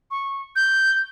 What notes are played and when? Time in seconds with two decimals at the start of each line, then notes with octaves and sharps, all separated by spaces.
0.11 C#6
0.56 G6